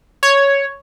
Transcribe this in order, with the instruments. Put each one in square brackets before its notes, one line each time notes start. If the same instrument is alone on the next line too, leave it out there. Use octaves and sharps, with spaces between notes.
[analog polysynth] C#5